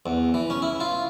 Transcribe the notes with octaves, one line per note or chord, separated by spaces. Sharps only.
E2
E3
C#4
E4
F4